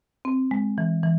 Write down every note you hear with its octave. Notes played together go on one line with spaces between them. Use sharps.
C4
G#3
E3
E3